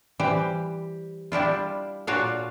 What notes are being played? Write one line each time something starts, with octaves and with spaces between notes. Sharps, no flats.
E3 G3 G4 C5
G3 D4 E4 F4
A#2 D4 F4 F#4 C#5 F5